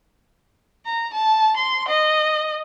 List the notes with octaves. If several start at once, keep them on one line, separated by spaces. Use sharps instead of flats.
A#5
A5
C6
D#5